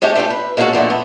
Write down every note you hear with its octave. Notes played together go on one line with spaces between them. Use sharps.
G#3 A3 C#4 G4
A3 D4 E4 F4 G4
B4
G#3 A#3 C#4 D4 F#4 A4
F2 A#2 D3 A3
B3